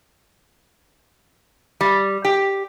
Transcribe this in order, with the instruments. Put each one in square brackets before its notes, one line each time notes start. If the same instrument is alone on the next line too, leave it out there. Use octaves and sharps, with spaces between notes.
[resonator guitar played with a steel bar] G3
G4